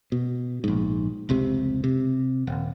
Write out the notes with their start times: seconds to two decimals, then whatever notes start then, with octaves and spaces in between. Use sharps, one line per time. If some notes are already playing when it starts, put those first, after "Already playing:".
0.12 B2
0.64 A#1 G#2
1.29 F1 C#2 C3
1.84 C3
2.47 D#1